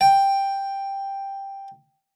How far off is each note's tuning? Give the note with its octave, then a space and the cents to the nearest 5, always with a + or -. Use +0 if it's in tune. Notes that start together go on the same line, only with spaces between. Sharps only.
G5 +5